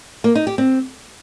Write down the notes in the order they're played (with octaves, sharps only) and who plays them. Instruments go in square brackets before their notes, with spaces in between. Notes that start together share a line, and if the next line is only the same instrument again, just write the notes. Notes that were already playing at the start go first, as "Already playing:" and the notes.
[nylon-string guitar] A#3
D#4
G4
C4